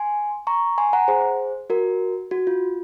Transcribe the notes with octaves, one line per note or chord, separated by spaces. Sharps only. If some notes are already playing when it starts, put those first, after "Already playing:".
Already playing: G#5 C6
A#5 C#6
G#5 C6
F#5 A#5
G#4 C5
F#4 A#4
F#4
F4